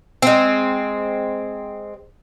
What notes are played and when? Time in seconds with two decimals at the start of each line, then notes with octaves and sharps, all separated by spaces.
0.22 G#3 C4